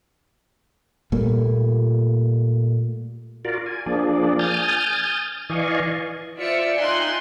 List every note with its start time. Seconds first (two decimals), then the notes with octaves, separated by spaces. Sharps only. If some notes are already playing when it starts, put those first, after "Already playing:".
1.12 A#2 G3 A3 A#3
3.45 F4 F#4 A#4 D5
3.66 G#5
3.86 F3 A#3 D4 G#4 D5
4.39 G#5 D#6 F6 G6 A6
5.50 E3 D5 D#5 F5 G#5 C#6
6.38 F4 C5 D5 E5 C#7
6.76 D#4 F4 G5 G#5 C6 F#6